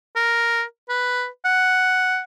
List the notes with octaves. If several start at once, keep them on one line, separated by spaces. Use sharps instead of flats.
A#4
B4
F#5